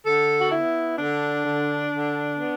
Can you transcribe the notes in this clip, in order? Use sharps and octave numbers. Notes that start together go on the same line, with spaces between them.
D3 A4
F#4
B3 E4
D3 D4
D3
D3
B3